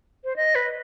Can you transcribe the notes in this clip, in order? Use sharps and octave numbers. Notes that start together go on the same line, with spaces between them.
C5
D#5
B4